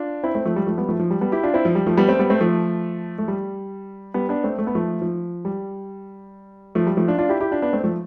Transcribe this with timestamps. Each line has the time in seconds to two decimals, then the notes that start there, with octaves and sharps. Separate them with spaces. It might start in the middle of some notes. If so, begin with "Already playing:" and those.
Already playing: D4 F4
0.24 C4 E4
0.35 A3 C4
0.46 F3 A3
0.56 G3
0.67 F3 A3
0.78 G3 B3
0.89 F3 A3
1.00 F3
1.11 G3
1.21 G3 B3
1.32 E4 G4
1.43 D4 F4
1.54 C4 E4
1.65 F3
1.75 G3
1.87 F3 A3
1.97 G3 B3
2.09 A3 C4
2.19 G3 B3
2.30 A3 C4
2.41 F3 A3
3.18 A3
3.28 G3
4.14 G3 B3
4.29 B3 D4
4.44 A3 C4
4.59 A3
4.67 B3
4.75 F3 A3
5.02 F3
5.45 G3
6.75 F3 A3
6.87 G3
6.97 F3 A3
7.08 D4 F4
7.18 D4 F4
7.29 E4 G4
7.40 E4 G4
7.51 D4 F4
7.62 B3 D4
7.73 A3 C4
7.84 F3 A3